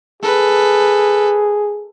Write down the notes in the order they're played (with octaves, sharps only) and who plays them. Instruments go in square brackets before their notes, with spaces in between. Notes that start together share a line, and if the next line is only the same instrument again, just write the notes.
[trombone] G#4 [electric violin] A4 B4